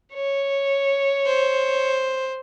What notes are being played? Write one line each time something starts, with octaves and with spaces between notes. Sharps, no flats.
C#5
C5